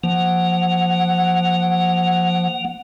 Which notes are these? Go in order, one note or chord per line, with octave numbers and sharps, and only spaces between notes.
F3 A#3 F#5